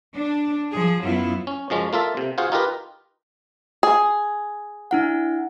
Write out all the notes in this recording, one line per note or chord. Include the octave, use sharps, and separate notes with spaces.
D4
F3 G#4
F#2 F#3 B3 E4 F4
C#4
F#2 F3 G#3 C#4
A#3 F4 A4 E5
C3
F4 F#4 G#4 C5 F5 F#5
D#4 F4 G4 A#4 B4
G#4
D4 E4 F#5